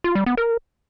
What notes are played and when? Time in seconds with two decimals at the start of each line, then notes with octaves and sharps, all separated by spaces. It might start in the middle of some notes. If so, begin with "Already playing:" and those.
0.04 F4
0.15 G3
0.26 B3
0.37 A#4